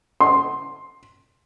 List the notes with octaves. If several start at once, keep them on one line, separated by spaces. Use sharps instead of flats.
C6